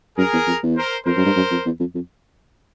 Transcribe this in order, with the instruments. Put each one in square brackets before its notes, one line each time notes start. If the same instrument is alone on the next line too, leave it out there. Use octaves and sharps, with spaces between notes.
[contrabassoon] F#2 [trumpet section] G#4 A#4
[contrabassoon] E2
F2
E2
[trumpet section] A#4 C5
[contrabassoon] F2 [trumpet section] A#4 C5
[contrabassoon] F#2
G2
F#2
F2
E2
F2
F2